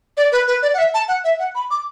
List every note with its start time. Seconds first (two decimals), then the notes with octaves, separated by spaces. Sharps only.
0.17 D5
0.32 B4
0.47 B4
0.62 D5
0.74 F#5
0.78 E5
0.94 A5
1.08 F#5
1.24 E5
1.39 F#5
1.55 B5
1.71 D6